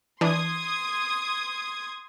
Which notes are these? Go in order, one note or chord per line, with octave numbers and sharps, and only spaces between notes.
E3 D4 C6 D#6 G#6